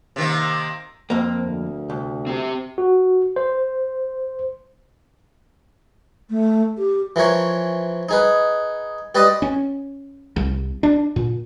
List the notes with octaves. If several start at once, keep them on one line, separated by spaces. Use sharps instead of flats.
C3 D#3 A#3
F2 A#3 C4
D2
C2
C4 G4
F#4
C5
A3
G4
E3 F3 A#4 C#5
D#4 G#4 B4
G4 B4 D5 D#5 C6 D#6
C#4
C2
D4
A#2